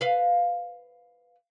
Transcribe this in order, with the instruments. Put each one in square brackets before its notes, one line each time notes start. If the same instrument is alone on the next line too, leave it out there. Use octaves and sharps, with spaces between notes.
[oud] B4 F5